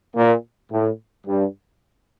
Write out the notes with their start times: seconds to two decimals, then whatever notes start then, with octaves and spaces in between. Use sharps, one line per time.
0.15 A#2
0.71 A2
1.27 G2